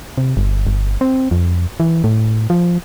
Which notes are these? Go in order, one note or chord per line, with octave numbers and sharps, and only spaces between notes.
C3
G1
G1
C4
F2
E3
A2
F3